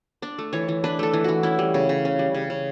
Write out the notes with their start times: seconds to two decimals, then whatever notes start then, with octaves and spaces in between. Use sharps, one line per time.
0.22 D4 D5
0.39 A3
0.53 E3 C#5
0.68 E3
0.84 D4 B4
0.99 A3 A4
1.13 E3
1.24 E3 F#4
1.43 C#4 E4
1.59 G3
1.74 C#3
1.89 C#3
2.05 C#4
2.19 G3
2.34 C#3
2.50 C#3